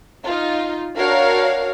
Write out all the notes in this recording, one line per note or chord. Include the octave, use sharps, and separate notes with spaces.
D#4 F4
D4 F#4 A#4 C#5 F5